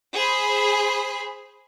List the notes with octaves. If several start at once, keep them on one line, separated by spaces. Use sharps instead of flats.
G#4 C5 B5